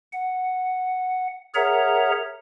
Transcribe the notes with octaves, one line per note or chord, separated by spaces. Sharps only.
F#5
G#4 A#4 C#5 E5 F#5 A#5